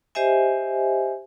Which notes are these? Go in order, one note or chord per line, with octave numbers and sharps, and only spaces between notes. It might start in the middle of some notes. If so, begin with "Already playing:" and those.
G4 C5 D#5 E5 G#5